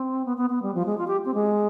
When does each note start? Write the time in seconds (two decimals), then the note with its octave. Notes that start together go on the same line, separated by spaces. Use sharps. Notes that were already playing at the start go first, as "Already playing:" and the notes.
Already playing: C4
0.25 B3
0.37 B3
0.50 B3
0.62 G3
0.74 F3
0.86 G#3
0.98 F4
1.07 G4
1.25 C4
1.34 G#3